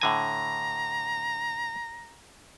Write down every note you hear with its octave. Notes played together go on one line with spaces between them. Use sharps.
A2 D3 G#5 A#5